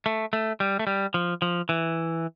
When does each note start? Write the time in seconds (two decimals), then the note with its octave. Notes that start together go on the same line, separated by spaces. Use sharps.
0.06 A3
0.33 A3
0.60 G3
0.79 A3
0.87 G3
1.14 F3
1.42 F3
1.69 E3